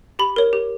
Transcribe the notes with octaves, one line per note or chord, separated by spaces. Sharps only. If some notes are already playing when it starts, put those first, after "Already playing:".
G4 B5
A#4 C#5
G4